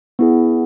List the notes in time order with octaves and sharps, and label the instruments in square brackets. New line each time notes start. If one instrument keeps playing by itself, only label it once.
[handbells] B3 E4 G#4